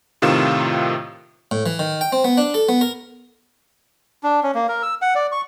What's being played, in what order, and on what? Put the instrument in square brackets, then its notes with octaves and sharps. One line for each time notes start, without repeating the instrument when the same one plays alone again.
[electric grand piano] A2 C3 D#3 F4 E7
[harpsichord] A2
E3
D#3
G5
C4
B3
D4
A4
B3
A#4
[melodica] D4
C#4
A#3
A#4
E6
F#5
D5
C#6